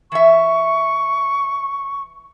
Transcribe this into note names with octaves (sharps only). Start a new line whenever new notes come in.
E3 E5 C#6